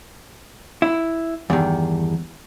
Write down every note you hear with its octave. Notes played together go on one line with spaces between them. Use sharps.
E4
E2 G2 D#3